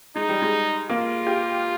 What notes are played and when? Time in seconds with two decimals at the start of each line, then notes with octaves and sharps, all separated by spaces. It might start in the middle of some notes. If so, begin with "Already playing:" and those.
0.16 G#3 D#4
0.29 G3
0.42 G#3
0.90 A#3 F4
1.27 G4